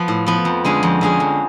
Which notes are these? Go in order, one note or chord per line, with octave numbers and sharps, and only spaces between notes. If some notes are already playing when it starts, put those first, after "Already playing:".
Already playing: F3 B3
A2
F3 B3
F2
D3 G#3 C#4 G#4
F2
D3 G#3 C#4 G#4
F2